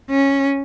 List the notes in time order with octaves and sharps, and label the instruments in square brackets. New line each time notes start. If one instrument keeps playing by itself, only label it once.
[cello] C#4